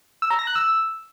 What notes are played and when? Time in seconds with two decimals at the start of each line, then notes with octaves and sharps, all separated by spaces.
0.22 E6
0.30 A#5
0.39 A#6
0.47 F#6
0.55 E6